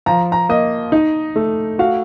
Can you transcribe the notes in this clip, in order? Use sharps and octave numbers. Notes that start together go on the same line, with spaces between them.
F3 A#5
A#5
A#3 D#5
D#4
A3
F#4 F5